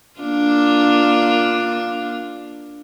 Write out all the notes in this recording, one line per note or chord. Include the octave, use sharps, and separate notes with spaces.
A#3 D4 F4